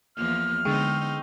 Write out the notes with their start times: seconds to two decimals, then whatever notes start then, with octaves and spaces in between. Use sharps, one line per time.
0.16 E2 F3 A#3 F6
0.65 D3 G#3 B3 D#4 C5 G5 C#6 E6